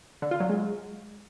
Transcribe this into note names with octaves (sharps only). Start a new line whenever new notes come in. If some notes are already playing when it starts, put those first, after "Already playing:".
D3
F4
F#3
G#3